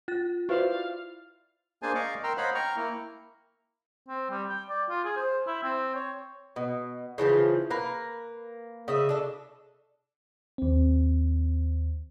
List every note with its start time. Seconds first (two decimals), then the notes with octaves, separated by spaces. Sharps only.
0.08 F4 A6
0.49 E4 F#4 B4 C5 D5 F5
1.82 A#3 D4 G#4 C5 G#5 A5
1.95 D5 D#5 F5 C#6 D6
2.24 A#4 G5 A#5 C6 E6 F6
2.37 C5 C#5 D#5 F5 F#5 B5
2.55 G5 A#5 C#6 F6
2.76 A#3 E4
4.08 C4
4.30 G3
4.49 G5
4.69 D5
4.89 F4
5.04 G#4
5.16 C5
5.47 E4
5.63 C4
5.95 C#5
6.56 B2
7.18 C#3 E3 F3 F4
7.70 A#3 A#4 B4
8.88 C#3 D#5 E5
9.09 D4 A4
10.58 D#2 C4